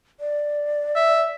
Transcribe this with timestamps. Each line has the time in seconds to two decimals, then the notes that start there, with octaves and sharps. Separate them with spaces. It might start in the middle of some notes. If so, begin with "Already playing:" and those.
0.20 D5
0.96 E5